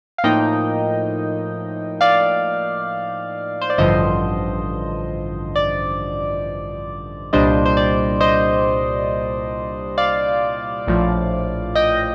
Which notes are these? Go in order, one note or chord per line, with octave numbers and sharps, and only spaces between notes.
F5
A2 F3 A#3 D#4 D#5 G5
D5 F5
C5
D5
A1 G2 D3 F3 C5 D#5
D5
C2 A#2 G3 D4 C5 D#5
C5
D5
C5 D#5
D5 F5
A#1 A2 F3
D#5 G5